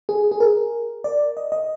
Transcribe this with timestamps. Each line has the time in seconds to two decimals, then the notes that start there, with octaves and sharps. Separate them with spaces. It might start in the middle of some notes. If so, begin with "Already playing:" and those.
0.09 G#4
0.31 G#4
0.40 A#4
1.04 D5
1.37 D#5
1.52 D#5